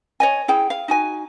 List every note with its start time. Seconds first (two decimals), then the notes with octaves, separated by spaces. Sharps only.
0.20 C#5 D#5 G#5
0.48 E4 G#4 G5
0.70 F5
0.88 D#4 F#4 G#5